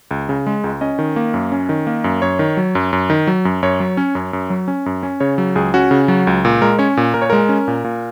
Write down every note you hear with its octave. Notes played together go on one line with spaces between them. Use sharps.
C#2
C#3
G#3
C#2
C#4 D#5
D#3
A#3
F#2
C#4
D#3
A#3
F#2
F#2 C#5
D#3
F#3
F#2
F#2
D#3
F#3
F#2
F#2 C#5
F#3
C#4
F#2
F#2
F#3
C#4
F#2
C#4
C#3 C#5
F#3
C#2 G#4
C#4 F#4
C#3
F#3 F#4
C#2
A#2
G#3 A#4
C#4 C#5
A#2
A#2 A#4
C#5
G#3 A#4
C#4
A#2
A#2